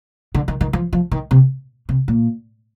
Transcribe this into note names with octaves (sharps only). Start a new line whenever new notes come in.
D3
D#3
D#3
F3
F3
D#3
C3
C3
A#2